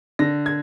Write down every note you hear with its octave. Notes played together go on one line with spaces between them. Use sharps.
D3 A#6
G#6